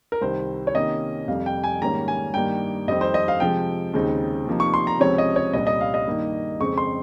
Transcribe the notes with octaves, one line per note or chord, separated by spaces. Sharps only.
A#4
C2 C3 D#3 C5
C#5
C3 D#3 A#3 C#4 D#5
F2 C3 G3 F5
G5
G#5
G#2 D#3 G3 A#3 C#4 A#5
G#5
G2 D#3 G3 A#3 D#4 G5
F2 D#3 G3 C4 D#5
C5
D#5
F5
C3 F3 G#3 G5
D#2 C#3 G#3 C4 D#4
C3 F3 A#3 D#4
C#6
C6
A#5
C#2 C3 F3 C4 C#5
D#5
C#5
C2 A#2 G3 C#4 D#5
D#5
F5
D#5
G2 D#3 A#3 D#4
F2 C#3 G#3 C4 C#6
C6